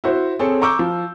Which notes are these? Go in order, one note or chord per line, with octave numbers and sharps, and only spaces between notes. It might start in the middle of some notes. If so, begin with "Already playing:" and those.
E4 F#4 C5
C4 G#4 A4 C#5
A#5 C#6 D6 E6 G6
F3